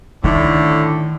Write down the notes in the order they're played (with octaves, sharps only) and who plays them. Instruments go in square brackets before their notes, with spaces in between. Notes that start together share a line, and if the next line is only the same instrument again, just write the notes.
[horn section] A2 D3 [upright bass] D#3